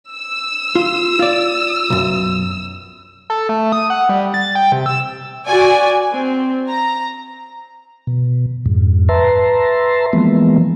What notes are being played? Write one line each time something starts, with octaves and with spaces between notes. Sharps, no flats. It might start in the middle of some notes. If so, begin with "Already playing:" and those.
E6
F4
F4 D5
B1 F#2
A4
A3
D#6
F#5
G3
A6
G5
C3
E6
F#4 D5 G#5
C4
A#5
B2
F2 G#2
B4 E5 A5 A#5 C6
E3 F3 G#3 A#3 B3